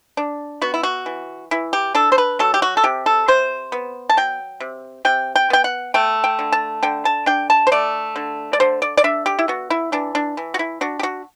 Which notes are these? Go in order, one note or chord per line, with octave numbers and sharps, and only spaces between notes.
D4
B3 F#4
E4
F#4
E3
E3 E4
G4
D4 A4
C5
B4
F#3 A4
G4
F#4
A4
C3 G4
A4
C3 C5
B3
A5
F#3 G5
C3
C3 G5
G5
B3 G5
F#5
A3 G5
G5
D3
A5
D3 G5
A5
D4 G5
A5
C5
A3 D5
D3
D5
D3 C5
D5
D5
D4 E5
G4
E4
B3 F#4
E4
E3 D4
D4
E3
F#4
E4
D4 F#4
G4
F#4